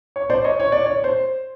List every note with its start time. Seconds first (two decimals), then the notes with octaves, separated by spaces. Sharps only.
0.16 C#5
0.30 C5 D5
0.44 C#5 D#5
0.60 C#5
0.72 D5
0.86 C#5
1.04 C5